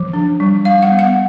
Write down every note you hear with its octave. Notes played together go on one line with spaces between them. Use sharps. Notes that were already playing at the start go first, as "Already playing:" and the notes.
Already playing: F3
D4
G3
G3 F5
F#5
B3
F#5